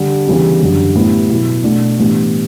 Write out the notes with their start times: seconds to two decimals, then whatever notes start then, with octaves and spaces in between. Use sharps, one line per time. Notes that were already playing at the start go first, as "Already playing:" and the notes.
Already playing: D3 G3 D4
0.27 C#3 E3 G3 B3 D4
0.61 F#2 D3 G3 D4
0.95 A2 G3 B3 E4
1.29 B2 F#3 B3 E4
1.64 B2 A3 D4
1.98 A2 E3 G3 B3 D4